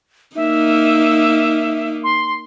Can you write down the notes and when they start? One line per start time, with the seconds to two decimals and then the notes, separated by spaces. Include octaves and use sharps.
0.36 A#3 D#4 E5
2.04 C6